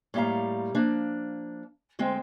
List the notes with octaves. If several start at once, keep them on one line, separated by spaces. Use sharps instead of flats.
A2 G3 A#3 E5 F5 A#5
F3 A#3 D4
D2 G#3 C4 G5